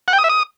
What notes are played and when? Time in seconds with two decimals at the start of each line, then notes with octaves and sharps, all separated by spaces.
0.08 F#5
0.13 G5
0.19 D#6
0.24 E5
0.29 D#6